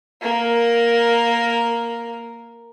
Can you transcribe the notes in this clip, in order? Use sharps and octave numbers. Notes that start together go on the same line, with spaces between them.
A#3 A#4